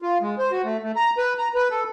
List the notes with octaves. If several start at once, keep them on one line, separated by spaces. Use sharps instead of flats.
F4
G#3
C5
F#4
A3
A3
A#5
B4
A#5
B4
A4